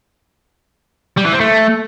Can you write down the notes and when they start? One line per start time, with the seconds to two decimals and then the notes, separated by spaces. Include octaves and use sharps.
1.18 G3
1.25 E3
1.33 C4
1.40 A3